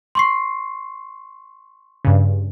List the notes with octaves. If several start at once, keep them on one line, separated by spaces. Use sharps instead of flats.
C6 C#6 C7
G2 C#3